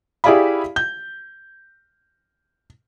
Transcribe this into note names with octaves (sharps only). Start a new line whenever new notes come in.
E4 G4 G#4 D5 F5 B5
G6